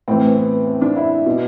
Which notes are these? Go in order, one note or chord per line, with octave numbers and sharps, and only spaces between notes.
A2 E3 C4
B3
C4
D4
E4
B2